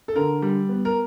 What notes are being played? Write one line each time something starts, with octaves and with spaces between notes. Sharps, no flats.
A4
D3 A#4
G3
B3
A#4